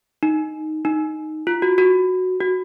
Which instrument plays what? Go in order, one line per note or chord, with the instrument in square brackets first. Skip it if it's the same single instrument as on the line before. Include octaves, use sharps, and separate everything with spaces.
[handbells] D#4
D#4
F4
F#4
F#4
F#4